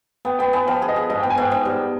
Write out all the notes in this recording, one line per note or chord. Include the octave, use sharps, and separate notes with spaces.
B3 G5
B3 G5
B3 G#5
F3 G5
G#4
D#5
G#4
G#2 D#5
B3 G5
G#5
G#2 G5
G#2 G5
G3